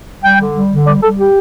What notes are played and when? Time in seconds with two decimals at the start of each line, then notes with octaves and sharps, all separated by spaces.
0.23 G3 G5
0.40 D3
0.54 G3
0.71 D3
0.87 G3 D5
1.03 G3 A4
1.18 G4